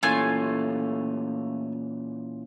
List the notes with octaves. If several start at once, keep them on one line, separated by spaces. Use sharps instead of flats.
A#2 E3 A3 C#4 F4 G#5